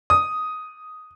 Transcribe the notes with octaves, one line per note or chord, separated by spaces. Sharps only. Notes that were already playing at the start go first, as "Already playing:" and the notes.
D#6